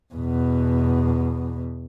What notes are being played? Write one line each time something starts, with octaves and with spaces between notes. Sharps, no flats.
E2 B2